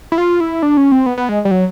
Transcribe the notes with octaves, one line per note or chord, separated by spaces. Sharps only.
E4
F4
E4
D4
C#4
C4
B3
B3
G#3
G3
F#3